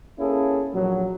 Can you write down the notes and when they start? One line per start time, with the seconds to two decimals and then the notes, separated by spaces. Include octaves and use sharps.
0.19 A#3 C#4 E4 G#4 A4
0.73 A#1 F#3